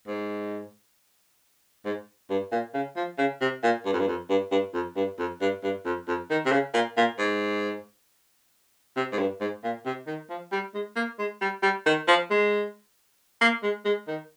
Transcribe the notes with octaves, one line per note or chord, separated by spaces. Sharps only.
G#2
G#2
G2
A#2
C#3
F3
C#3
C3
A#2
G2
F2
G2
F2
G2
G2
F2
G2
F2
G2
G2
F2
F2
D#3
C3
C#3
A#2
A#2
G#2
C3
G#2
G2
G#2
A#2
C3
D#3
F3
G3
G#3
A#3
G#3
G3
G3
D#3
F3
G#3
A#3
G#3
G#3
D#3